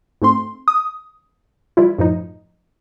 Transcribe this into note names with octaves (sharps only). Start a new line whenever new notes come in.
G#2 A3 C4 C6
D#6
E3 G3 E4 F4
F#2 A2 F3 D#4